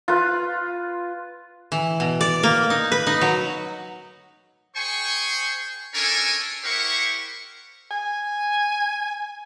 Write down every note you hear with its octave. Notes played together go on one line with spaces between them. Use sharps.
F4 B4
E3
B2
D5
A#3
D#4
B4
D#4
F#3
G#4 C5 G5 G#5 C#6
C#4 D4 A4 A#4 C#5 G#5
E4 G4 A#4 C5 F#5 C#6
G#5